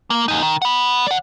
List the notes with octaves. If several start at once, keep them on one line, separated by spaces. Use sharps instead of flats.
A#3
E2 D#4
D#3
F#5 B5
D5 F#5